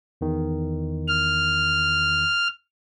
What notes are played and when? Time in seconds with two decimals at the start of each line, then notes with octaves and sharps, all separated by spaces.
0.21 E2 D#3
1.08 F6